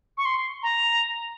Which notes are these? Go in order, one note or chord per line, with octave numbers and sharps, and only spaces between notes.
C#6
C6
A#5